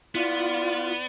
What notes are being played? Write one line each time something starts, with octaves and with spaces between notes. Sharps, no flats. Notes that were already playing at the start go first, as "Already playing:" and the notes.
B3 E4 F4 D5